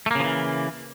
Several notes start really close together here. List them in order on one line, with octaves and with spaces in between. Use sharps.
A3 A#3 C#3 F3 E3